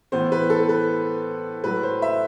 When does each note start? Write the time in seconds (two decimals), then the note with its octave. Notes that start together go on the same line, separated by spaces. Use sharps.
0.12 A2 E3 B3 C5
0.32 B4
0.50 A4
0.69 B4
1.64 A2 F#3 A3 B4
1.83 C5
2.02 E5